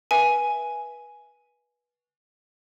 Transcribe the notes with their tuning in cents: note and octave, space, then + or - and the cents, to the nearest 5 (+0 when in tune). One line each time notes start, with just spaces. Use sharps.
B4 -25 E5 +0 G#5 +5